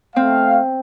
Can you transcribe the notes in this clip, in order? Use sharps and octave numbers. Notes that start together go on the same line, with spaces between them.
A3 C4 F5